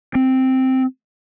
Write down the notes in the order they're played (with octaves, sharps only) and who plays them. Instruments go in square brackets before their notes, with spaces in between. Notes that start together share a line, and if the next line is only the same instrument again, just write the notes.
[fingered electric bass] C4